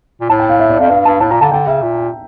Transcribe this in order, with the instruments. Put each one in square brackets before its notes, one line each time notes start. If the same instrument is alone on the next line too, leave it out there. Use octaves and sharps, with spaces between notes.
[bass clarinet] A#2
[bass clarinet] A2 [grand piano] A5
[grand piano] G5
F5
E5
D5
[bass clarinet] F2 [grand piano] F5
[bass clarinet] G2 [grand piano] F5
[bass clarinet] G2 [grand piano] A5
[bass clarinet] A2 [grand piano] A5
[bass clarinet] A#2 [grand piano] A#5
[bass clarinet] D3 [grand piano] A5
[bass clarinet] D3 [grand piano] G5
[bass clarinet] C#3 [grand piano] E5
[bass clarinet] A#2